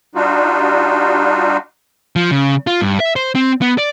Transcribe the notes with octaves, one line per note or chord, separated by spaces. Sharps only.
G3 D4 D#4 F4 F#4
F3
C#3
F4
G2
E5
C5
C4
B3
D5